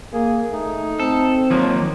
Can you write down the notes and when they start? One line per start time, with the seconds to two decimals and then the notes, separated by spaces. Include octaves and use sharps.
0.13 A#3 G#4
0.52 A3 D#4
1.00 C4 A4
1.51 D#2 F3 F#3 A#3